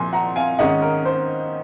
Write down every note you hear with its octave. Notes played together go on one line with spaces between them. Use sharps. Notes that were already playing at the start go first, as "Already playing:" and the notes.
Already playing: A#2 F3 G#5 C6
F#5 A#5
F5 G#5
G#2 D#3 G#3 C#4 D#5 F#5
A#4
C5